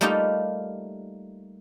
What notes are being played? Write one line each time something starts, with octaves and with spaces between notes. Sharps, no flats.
G3 A3 A#3 D#4 F4 G4